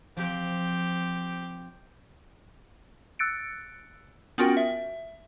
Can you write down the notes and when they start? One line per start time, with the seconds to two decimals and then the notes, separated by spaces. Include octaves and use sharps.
0.16 F3 C4 G4
3.19 E6 F#6 A6 C#7 D7
4.38 B3 C#4 F4 F#4 A#4 G5
4.57 E5